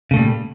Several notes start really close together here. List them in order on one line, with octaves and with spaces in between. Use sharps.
C#3 A3 A#2 G3